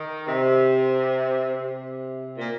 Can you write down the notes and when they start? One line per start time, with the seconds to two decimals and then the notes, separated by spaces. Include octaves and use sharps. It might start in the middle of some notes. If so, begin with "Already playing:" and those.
Already playing: D#3
0.27 C3
1.54 C3
2.37 A#2